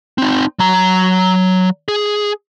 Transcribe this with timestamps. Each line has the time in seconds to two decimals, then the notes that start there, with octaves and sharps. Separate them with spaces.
0.18 C4 D#4
0.59 F#3 A#5
1.88 G#4